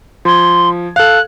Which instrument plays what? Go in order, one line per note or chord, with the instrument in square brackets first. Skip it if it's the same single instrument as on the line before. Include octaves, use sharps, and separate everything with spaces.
[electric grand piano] F3 G#6 [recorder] C6
[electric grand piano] A4 F5 [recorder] F#6